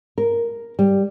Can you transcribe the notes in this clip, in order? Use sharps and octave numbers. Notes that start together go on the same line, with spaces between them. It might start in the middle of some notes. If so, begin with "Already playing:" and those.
A#4
G3